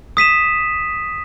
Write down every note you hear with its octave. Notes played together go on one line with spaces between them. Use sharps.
D#6 B6 D#7 E7